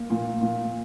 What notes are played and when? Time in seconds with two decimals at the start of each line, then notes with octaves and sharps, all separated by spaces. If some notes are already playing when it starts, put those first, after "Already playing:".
Already playing: A#3
0.10 A#2
0.41 A#2